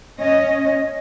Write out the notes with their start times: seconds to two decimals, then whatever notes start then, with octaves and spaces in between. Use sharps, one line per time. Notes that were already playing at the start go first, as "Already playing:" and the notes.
0.21 C#4 D#5